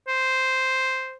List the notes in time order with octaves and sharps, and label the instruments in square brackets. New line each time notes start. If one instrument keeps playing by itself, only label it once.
[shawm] C5